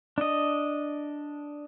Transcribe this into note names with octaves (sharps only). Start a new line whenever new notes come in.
D4 D#5